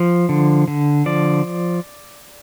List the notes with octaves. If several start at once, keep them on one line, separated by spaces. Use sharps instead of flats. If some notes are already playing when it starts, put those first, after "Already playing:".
Already playing: F3
D3
D3
F3 D5